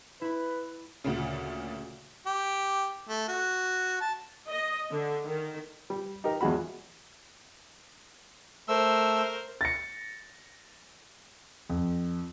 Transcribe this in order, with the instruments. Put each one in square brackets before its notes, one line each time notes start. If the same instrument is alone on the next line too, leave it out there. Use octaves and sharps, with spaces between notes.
[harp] E4 B5 [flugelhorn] B4
[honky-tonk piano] D2 A#2 C#3
[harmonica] G4
A3
F#4
A5
[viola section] D#5
D3
D#3
[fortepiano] G3
D#4 G4 A#4
E2 F3 G#3 F#4 B5
[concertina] A3 E6 [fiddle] A#4 C5
[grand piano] A6 A#6 C#7
F2